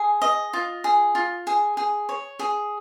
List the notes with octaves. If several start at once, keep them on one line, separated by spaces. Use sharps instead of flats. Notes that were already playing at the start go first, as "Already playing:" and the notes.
Already playing: G#4
D#5
F4
G#4
F4
G#4
G#4
C#5
G#4